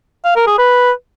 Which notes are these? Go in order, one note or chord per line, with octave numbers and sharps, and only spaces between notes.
F5
A#4
G#4
B4